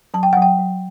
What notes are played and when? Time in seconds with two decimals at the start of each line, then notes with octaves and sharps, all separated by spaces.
0.14 F#3 A5
0.23 G5
0.33 F#3 F#5
0.42 G5
0.59 F#3